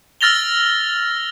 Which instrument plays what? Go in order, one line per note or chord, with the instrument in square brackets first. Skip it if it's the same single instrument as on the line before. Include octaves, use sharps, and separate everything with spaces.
[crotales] E6 F6 A6 A#6 F7 G7